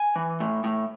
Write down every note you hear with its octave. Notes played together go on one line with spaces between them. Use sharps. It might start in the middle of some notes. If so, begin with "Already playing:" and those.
Already playing: G#5
E3
A2
A2